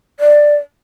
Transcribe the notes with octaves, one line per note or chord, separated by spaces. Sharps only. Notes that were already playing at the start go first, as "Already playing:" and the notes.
D5